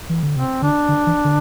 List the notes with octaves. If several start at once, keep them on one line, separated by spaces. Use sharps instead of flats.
E3
D3
C3 C4
D3 D4
D3
E3
D3